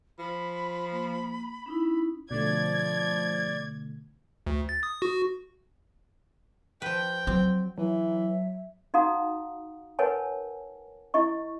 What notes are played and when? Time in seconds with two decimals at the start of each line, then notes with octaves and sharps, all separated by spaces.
0.19 F3 B5
0.92 A#3
1.66 C#4 D#4 E4
2.31 B2 D3 F3 A3 D5 G#6
4.47 D2
4.69 A6
4.83 D#6
5.02 F#4
6.82 F3 B4 G5
7.27 F#3 C4
7.78 E3 F#3 E5
8.94 D#4 F#4 F5 F#5 A#5 D#6
9.99 A#4 B4 C#5 F#5 G#5 A5
11.14 E4 G4 D#5 C#6